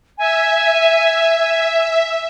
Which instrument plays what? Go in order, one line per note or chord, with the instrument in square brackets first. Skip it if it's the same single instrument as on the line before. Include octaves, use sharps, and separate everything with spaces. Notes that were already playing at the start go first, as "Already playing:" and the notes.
[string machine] E5 [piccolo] G#5